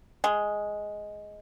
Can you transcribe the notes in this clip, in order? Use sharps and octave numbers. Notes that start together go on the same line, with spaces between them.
G#3